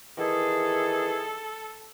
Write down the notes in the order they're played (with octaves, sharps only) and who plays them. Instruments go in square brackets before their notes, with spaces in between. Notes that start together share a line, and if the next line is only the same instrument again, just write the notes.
[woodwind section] D#3 E3 G#4 [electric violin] A4